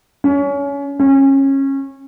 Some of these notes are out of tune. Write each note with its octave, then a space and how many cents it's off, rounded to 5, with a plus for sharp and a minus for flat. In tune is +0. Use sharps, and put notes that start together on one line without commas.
C#4 +25
C#4 -25